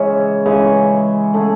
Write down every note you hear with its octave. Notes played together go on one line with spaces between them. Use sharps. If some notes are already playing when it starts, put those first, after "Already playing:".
Already playing: C#3 E3 G#3 C#4
C#3 E3 G#3
A3 C#4 G#4